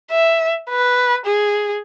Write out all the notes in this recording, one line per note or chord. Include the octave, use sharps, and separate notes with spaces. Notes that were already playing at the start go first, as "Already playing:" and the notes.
E5
B4
G#4